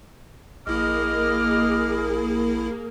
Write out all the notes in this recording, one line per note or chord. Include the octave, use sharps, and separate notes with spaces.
A#1 A#3 E4 G#4 D#5 D6 F6